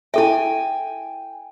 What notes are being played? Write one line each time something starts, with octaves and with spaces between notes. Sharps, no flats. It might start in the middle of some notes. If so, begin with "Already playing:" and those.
E4 A4 E5 G5 G#5